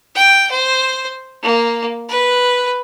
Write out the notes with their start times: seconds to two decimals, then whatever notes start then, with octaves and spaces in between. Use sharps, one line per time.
0.16 G5
0.51 C5
1.43 A#3
2.09 B4